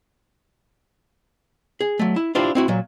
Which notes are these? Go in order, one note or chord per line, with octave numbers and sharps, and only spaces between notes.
G#4
F#3 A3
E4
D4 E4 F4 G4 C5 D5
C4 E4 F#4
A#2 F#3